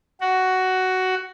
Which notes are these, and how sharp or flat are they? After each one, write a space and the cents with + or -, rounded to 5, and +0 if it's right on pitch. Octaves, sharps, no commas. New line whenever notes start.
F#4 +10